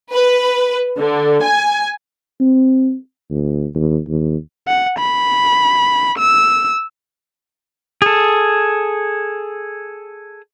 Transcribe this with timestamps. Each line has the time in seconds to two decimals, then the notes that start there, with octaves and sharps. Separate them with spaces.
0.13 B4
0.97 D3
1.43 G#5
2.40 C4
3.30 D2
3.75 D#2
4.08 D#2
4.68 F#5
4.99 B5
6.18 E6
8.02 G#4 A4